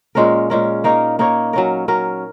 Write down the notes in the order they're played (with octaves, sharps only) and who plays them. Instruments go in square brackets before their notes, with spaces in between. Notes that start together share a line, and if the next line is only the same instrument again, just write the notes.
[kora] A#2 G#3 C#4 A#4
A#2 G#3 C#4 A#4
A#3 D#4 A#4 C#5
A#3 D#4 A#4 C#5
F#3 C#4 A#4
F#3 C#4 A#4